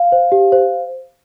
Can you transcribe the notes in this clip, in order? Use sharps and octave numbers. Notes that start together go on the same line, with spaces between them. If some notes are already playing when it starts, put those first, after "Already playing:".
Already playing: F5
C5
G4
C5